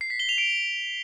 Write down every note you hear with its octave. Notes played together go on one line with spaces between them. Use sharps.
C7
B6
G7
F7
D7